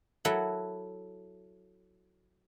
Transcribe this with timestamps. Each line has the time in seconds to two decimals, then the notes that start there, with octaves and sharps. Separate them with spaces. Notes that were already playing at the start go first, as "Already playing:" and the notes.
0.25 F#3 E4 A4 E5 F#5